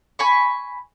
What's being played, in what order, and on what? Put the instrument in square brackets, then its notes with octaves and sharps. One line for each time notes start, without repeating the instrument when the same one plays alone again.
[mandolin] G#5 B5 C#6